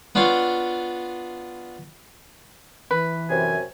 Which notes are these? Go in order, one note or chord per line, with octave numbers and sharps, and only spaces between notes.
B3 D4 F4 C#5 F5 G5
E3 B4
F#2 C3 G#5